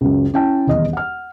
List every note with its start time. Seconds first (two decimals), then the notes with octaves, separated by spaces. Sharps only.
0.01 C#2 F#2
0.34 C#4 E4 G5 A5
0.67 D#1 E2 D#5
0.93 F#5 F6